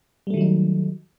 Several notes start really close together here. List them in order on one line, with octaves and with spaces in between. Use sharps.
G3 A3 D#3 F#3 D#4